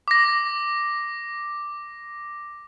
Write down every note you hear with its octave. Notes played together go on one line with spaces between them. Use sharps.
D6 A#6